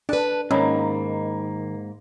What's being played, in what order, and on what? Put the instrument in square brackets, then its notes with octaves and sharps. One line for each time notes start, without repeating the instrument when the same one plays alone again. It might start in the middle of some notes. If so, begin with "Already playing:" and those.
[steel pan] D4 [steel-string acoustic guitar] B4 A5
[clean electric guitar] G#2 A#3 [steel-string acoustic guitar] D#3 [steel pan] C#4 [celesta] D#5 A#5 B5